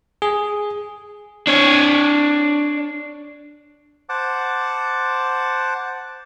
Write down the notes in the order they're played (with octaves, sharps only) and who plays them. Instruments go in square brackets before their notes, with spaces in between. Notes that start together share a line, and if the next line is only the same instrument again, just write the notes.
[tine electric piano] G#4
[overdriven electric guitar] D4 C#5
[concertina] C5 F#5 A5 D6